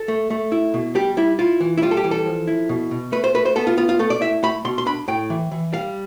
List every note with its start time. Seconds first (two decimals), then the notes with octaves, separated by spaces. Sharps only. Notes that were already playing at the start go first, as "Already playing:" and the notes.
Already playing: A4
0.08 A3
0.30 A3
0.52 E4
0.74 B2
0.95 G3 G4
1.17 G3 E4
1.39 E4 F4
1.60 E3
1.78 E4
1.82 G3 F4
1.91 A4
1.97 G4
2.04 E3
2.11 A4
2.26 F3
2.47 E4
2.69 B2
2.91 B2
3.12 A3 B4
3.24 C5
3.34 A3 B4
3.45 C5
3.56 B3 A4
3.67 F4
3.77 B3 F4
3.89 F4
3.99 A3 A4
4.10 D5
4.21 E4 E5
4.43 A3 B5
4.65 B2 C6
4.78 C6
4.86 D4 B5
5.08 A2 G5
5.30 E3
5.52 E3
5.73 G3 F5